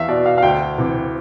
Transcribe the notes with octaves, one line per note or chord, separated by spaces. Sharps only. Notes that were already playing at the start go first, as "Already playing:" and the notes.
Already playing: E2 E5 F5
B2 D5
F5
F5
D2 G5
C3 E3